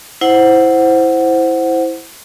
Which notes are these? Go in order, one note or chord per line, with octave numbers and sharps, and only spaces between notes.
E4 C5 F#5